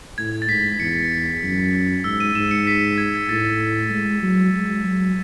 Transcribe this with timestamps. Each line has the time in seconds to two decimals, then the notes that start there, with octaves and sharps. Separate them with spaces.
0.18 A2 G#6
0.42 A6
0.49 G#2 B6
0.80 E2 C#7
1.43 F#2
2.04 G#2 E6
2.20 D#7
2.35 G#2 E7
2.51 C#7
2.67 B6
2.98 G#6
3.29 A2 A6
3.91 G#3
4.23 F#3
4.54 G#3
4.84 F#3